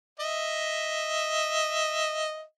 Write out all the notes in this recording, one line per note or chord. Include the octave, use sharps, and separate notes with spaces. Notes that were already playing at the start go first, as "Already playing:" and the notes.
D#5 E5